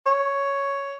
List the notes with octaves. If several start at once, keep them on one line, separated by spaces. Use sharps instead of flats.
C#5